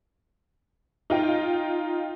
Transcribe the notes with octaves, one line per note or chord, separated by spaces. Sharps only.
D#4 F4 G5